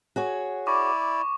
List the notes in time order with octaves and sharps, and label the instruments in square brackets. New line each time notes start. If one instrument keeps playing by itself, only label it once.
[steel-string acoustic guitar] F#4 G#4 C#5
[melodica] E4 D5 [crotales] C#6 D6